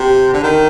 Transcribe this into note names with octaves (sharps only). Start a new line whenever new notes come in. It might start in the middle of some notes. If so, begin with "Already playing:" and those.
Already playing: C3
D3
D#3